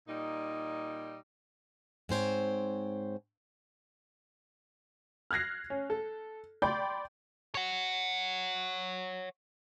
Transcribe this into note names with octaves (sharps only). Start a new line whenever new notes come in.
A#2 G3 D#4
G#2 C4 C5 C#5
F6 F#6 G#6 A#6 C7
C#4
A4
D5 G5 B5 C6 G6
C#5 F#5